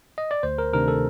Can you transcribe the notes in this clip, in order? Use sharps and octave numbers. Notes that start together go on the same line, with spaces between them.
D#5
D5
D2 C5
A#4
C3 D#3 A3 D4 A#4
A4